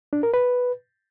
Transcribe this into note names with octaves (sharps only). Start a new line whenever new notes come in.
D4
A#4
B4